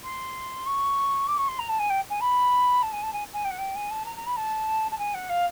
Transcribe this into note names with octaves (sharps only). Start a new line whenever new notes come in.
C6
C#6
D6
C#6
C6
A#5
A5
G#5
G5
G#5
B5
A5
G#5
A5
G#5
G#5
G5
F#5
G5
G#5
A5
A#5
A#5
B5
A5
A5
G#5
F#5
F5